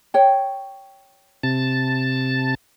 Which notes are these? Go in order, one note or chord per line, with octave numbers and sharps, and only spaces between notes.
C#5 G5
C3 A5